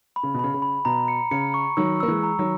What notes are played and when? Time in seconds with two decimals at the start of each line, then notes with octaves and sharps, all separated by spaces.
0.16 B5
0.23 C#3
0.34 B2
0.39 C#3 B5
0.54 C#3
0.62 B5
0.85 B2 A#5
1.08 C#7
1.31 C#3 C#7
1.54 C#6
1.77 D#3 F#3 E6
2.00 A#3 E6
2.08 E3 G#3
2.23 A#5
2.39 D#3 F#3